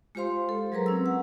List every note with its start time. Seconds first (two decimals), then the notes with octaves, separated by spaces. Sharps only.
0.15 G#3 F4 G4 C5 F5 C6
0.49 A4
0.72 F#3 G#4 A#4 B4 A#5
0.86 C4 C#4 E6
1.06 F#5